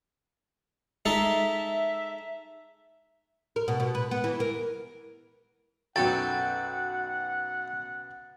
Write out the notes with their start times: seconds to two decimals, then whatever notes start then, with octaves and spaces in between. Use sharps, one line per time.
1.05 G#3 D#4 A4 E5
3.56 A#4
3.68 B2
3.80 B2
3.95 B4
4.11 B3
4.24 E3
4.40 A#4
5.96 B1 F#2 B3 F#4 A4 F#5 G5 A6